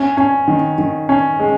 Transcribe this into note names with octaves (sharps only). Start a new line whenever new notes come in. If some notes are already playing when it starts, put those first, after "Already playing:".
Already playing: C#4
C#4
D#3
D#3
C#4
G#3